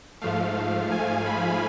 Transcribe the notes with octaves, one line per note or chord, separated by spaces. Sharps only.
G#2 F3 A3 F5
G#5
B5